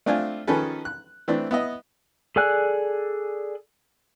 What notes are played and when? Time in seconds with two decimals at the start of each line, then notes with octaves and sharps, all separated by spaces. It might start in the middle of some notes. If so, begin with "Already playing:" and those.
0.06 A3 C4 D4 F4 F5 G#5
0.47 D#3 F3 C#4 G#4 A4 B4
0.85 F#6
1.28 E3 A3 C4 D4
1.51 B3 E4 D#5
2.36 G#4 A4 D5 G#5 F#6